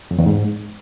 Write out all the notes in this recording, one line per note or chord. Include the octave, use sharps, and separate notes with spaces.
F2
E2
G#2